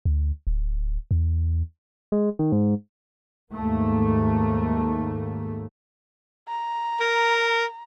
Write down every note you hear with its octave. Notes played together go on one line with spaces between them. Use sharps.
D2
D1
E2
G#3
D#3
G#2
D#2 G#2 A3 A#3
A#5
A#4